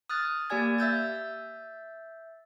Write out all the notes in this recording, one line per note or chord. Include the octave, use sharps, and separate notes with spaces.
D#6 F6 F#6 A6
A#3 G4 D5 G#5 G#6
E5 E6 G6 A6